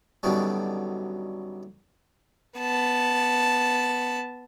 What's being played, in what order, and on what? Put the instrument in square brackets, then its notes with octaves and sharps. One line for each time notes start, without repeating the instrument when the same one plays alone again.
[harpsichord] F#2 B2 D3 D#3 G3
[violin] B3 A5